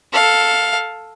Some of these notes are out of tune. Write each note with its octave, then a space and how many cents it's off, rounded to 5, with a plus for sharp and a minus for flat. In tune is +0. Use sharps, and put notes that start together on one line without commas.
A4 +5 F5 +10